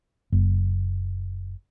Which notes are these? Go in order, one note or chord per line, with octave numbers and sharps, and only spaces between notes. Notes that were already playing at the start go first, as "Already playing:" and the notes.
F#1